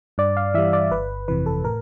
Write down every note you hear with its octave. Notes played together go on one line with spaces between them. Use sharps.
G2 D5
F5
E3 G3 E5
D5
G1 B4
F2 C3 E3 B4
A4
A2 A#4